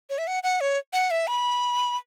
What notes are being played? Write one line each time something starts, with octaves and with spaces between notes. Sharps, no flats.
C#5
E5
F#5
F#5
C#5
F#5
E5
B5